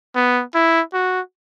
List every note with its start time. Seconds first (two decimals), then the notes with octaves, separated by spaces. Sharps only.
0.15 B3
0.54 E4
0.93 F#4